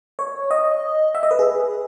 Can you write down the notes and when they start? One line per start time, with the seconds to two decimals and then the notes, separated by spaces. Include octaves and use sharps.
0.19 C#5
0.51 D#5
1.15 E5
1.23 D#5
1.31 B4
1.39 G#4